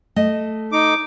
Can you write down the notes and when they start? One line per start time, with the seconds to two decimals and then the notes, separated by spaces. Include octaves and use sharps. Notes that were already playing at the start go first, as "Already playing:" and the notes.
0.16 A3 D#5
0.72 D#4 D6